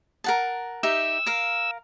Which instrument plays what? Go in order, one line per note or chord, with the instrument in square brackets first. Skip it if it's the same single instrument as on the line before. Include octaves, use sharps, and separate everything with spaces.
[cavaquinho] A#4 F#5 A5
[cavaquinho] D#4 G4 E5 [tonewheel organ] E6
[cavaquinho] A#4 F5